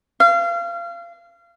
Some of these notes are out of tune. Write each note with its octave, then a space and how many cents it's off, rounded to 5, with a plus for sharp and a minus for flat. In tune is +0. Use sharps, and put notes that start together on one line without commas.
F5 -30